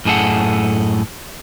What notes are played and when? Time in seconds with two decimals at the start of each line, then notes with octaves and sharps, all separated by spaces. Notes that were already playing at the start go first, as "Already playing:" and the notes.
0.05 F#2 A2 G#4 A4 F#5